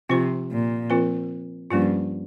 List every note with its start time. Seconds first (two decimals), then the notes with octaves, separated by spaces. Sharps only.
0.09 C3 F3 C4 F4 C5
0.50 A#2
0.90 F3 C4 F4 A#4
1.71 G2 F3 A#3 C#4 F4